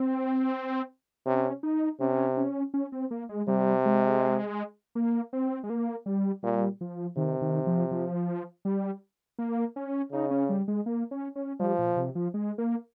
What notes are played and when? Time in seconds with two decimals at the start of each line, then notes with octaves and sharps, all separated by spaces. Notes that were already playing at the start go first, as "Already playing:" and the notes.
Already playing: C4
1.26 C3 C#4
1.63 D#4
2.00 C3 C#4
2.37 C#4
2.74 C#4
2.92 C4
3.11 A#3
3.29 G#3
3.48 C3 G3
3.85 G#3
4.95 A#3
5.33 C4
5.64 G#3
5.70 A#3
6.06 G3
6.43 A#2 G3
6.81 F3
7.17 C3 D#3
7.42 D#3
7.67 F3
7.91 F3
8.65 G3
9.39 A#3
9.76 C#4
10.12 C#3 D#4
10.31 C#4
10.49 G3
10.68 G#3
10.86 A#3
11.11 C#4
11.36 C#4
11.60 F3 G3
11.79 A#2
11.97 C3
12.15 F3
12.34 G#3
12.58 A#3